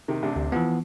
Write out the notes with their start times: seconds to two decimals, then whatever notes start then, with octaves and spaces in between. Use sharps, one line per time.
0.08 C3 D#3
0.22 A1 C3 D4
0.36 D2
0.52 E3 F3 B3